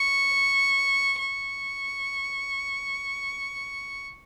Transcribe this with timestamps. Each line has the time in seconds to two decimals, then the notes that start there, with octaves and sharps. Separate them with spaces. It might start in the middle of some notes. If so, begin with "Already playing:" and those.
Already playing: C#6
1.18 C#6